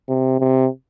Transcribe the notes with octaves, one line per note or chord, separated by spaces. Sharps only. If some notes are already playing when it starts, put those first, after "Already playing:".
C3
C3